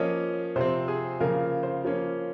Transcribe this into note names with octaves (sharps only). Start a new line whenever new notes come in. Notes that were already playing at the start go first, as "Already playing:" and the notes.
Already playing: F3 A#3 C#4 D#5
C3 F3 C4 C5
G#4
C#3 F3 A#3 A#4
C5
F3 A#3 C#4